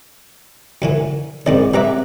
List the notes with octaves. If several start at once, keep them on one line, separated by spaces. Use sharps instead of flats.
F#2 D3 E3
G#2 D#3 C4 C#4 D5 D#5
G3 B4 E5 A#5 D6